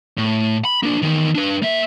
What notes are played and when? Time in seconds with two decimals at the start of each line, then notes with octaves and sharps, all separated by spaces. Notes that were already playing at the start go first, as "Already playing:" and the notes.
0.17 A2
0.65 B5
0.83 A#3 D4
1.02 E2 D#3
1.35 D4 B4
1.62 A#3 E5